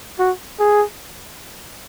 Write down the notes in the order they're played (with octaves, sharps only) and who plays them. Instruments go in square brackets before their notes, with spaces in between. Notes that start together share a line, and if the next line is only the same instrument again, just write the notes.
[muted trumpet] F#4
G#4